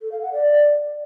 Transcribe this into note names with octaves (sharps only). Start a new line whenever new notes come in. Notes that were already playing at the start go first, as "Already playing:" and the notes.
A4
F5
F#5
D5